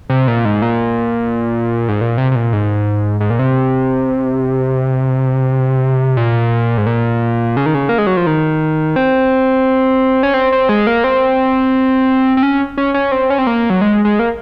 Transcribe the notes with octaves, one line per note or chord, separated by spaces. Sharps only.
C3
A#2
G#2
A#2
G#2
A#2
C3
C3
A#2
G#2
G#2
A#2
C3
A#2
G#2
A#2
C#3
D#3
C#3
A#3
G#3
F#3
F3
D#3
C4
C#4
C4
C4
G#3
A#3
C4
C4
C#4
C#4
C#4
C4
C#4
C4
A#3
F#3
G#3
G#3
A#3